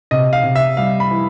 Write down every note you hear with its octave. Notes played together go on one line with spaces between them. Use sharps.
C3 D#5
F5
C3
E5
G3 F5
B5
E3